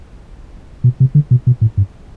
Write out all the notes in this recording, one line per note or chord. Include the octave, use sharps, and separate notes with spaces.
B2
C3
D3
B2
B2
A2
G2